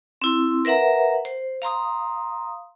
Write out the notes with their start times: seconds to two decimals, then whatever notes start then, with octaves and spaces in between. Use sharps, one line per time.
0.22 C4 E4 C6
0.65 A#4 B4 E5 F#5 A#5
1.25 C5
1.62 F5 A#5 C6 D#6